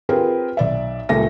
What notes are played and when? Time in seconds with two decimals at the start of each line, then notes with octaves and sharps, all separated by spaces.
0.09 C4 F4 G4 G#4 A#4 B4
0.57 B1 D5 E5
1.09 C#2 A#2 G3 A3 E5 A#6